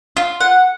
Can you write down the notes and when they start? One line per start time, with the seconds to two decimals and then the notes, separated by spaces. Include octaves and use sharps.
0.17 F4
0.40 F#5